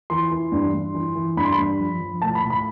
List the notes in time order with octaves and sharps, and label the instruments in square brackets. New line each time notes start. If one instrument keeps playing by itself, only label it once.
[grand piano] E3 C6
E3
G2
G2
E3
E3
G2 B5
C6
B5
G2
F3
F3
A2 A5
B5
A2
B5